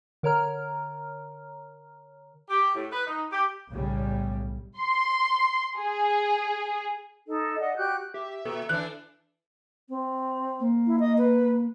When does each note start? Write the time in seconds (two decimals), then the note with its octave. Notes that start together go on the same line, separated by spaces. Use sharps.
0.23 D3 A#4 C#5 A#5 F6
2.49 G4
2.75 A2
2.92 B4
3.07 D#4
3.32 G4
3.70 B1 A2 C#3 G3
4.80 C6
5.77 G#4
7.27 D#4 A4 D#5
7.59 D5 D#5 F#5
7.76 F#4 G4 F#6 G6
8.14 G4 E5
8.45 A#2 A4
8.69 E3 D4 F#6
9.89 C4
10.60 A#3
10.87 E4
11.00 D#5
11.18 B4